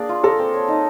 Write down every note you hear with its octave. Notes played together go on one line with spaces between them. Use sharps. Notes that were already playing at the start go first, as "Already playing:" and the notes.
Already playing: A#3 D4 G#4 D5
F4
A4 A#4
C4
C#5
D#4